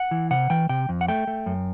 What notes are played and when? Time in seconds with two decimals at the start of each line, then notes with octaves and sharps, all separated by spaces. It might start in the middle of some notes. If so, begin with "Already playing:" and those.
Already playing: F#5
0.11 E3
0.31 C3 F#5
0.50 E3 G5
0.69 C3 G5
0.89 F2
1.01 F#5
1.08 A3 G5
1.27 A3
1.46 F#2